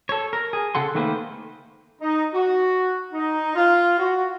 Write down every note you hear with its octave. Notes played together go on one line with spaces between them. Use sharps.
A4 C#5
A#4
G#4
C#3 A4 F#5 C6
D#3 A3 A#3 B4 C5
D#4
F#4
D#4
F4
F#4